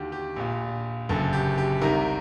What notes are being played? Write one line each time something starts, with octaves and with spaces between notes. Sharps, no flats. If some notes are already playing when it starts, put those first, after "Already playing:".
Already playing: D#2 D3 F#4 G4
G4
A#1 A#2
F#1 F#2 D3 A4
G4
G4
C2 C3 D#3 A#4